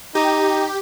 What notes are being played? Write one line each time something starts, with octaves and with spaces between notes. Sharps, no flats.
D#4 G4